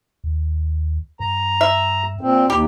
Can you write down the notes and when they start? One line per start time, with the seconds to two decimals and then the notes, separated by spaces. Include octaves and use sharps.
0.24 D#2
1.20 G2 A#5
1.61 E5
2.21 A#2 C4
2.50 D#2 G4